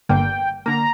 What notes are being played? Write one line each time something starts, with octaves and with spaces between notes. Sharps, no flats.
G1 G2 D3 A#3 G5
D3 A#3 A#5